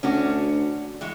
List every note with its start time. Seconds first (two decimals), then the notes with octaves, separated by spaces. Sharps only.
0.03 D2 C#4 D4 F#4
1.01 E3 G#3 F#4